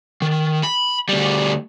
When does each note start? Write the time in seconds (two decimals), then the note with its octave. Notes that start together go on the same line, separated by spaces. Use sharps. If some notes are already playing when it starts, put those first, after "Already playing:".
0.22 D#3
0.63 B5
1.09 D2 G3